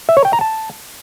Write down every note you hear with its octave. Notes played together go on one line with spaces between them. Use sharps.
E5
C#5
G5
A#5
A5